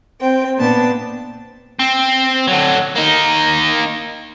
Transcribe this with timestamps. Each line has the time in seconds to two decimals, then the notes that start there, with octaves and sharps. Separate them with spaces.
0.19 C4 G5
0.58 A#2 B3 D4 A5
1.79 C4
2.48 D3 F#3
2.96 A#3 D#4